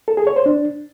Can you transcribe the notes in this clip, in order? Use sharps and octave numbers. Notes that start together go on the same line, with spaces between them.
A4
G#4
C#5
C5
D4